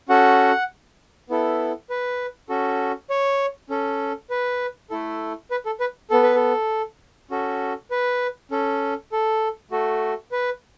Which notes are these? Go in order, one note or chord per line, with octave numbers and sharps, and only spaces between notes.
C#4 F#4 A4 F#5
B3 E4 A4
B4
C#4 F#4 A4
C#5
C#4 A4
B4
A3 E4 A4
B4
A4
B4
B3 A4
B4
A4
C#4 F#4 A4
B4
C#4 A4
A4
A3 F#4 A4
B4